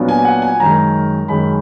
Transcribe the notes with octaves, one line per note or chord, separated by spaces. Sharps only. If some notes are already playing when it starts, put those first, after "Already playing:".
Already playing: A#2 F#3 B3 D4
G#5
F#5
G#5
F#2 D#3 G#3 A#5
F#2 D#3 G#3 B5